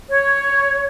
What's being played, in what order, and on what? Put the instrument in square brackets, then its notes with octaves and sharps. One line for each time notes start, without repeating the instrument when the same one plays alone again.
[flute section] C#5